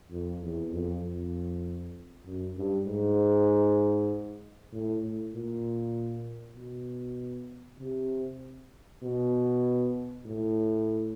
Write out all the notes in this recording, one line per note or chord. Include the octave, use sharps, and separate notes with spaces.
F2
E2
F2
F2
F#2
G2
G#2
A2
A2
A#2
B2
C3
B2
A2